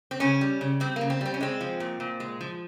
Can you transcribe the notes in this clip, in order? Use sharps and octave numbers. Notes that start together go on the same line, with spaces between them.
C4
C#3 C#4
G3
C#3
G3 C4
C#3 A#3
C4
G3 C4
C#4
G#3 C4
F3
A#2
A#2
G#3
F3